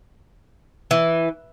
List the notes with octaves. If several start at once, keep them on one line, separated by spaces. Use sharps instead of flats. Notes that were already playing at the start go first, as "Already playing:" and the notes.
E3